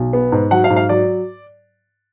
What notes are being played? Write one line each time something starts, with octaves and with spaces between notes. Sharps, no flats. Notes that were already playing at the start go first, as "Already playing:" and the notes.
Already playing: B1
B3
G#2
F#3 F#5
F5
G#2
F5
F#3 D5